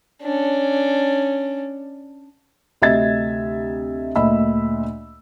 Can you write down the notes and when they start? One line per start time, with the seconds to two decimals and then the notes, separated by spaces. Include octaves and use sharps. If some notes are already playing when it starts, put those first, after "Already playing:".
0.22 C#4 D4
2.82 D2 C3 D#5 E5 G#6 A6
4.16 D2 A#2 D#5 E5 B5 E6